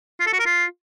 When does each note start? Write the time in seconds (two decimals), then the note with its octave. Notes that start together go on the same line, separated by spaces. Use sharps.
0.20 F4
0.27 A4
0.33 F#4
0.40 A#4
0.46 F4